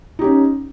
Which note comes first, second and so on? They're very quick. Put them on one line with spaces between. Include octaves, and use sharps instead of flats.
D#4 G4 C#4